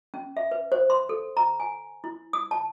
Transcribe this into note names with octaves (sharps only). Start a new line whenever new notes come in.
C#4
E5
B4
C5
C6
A4
A#5
G#5
E4
D#6
A5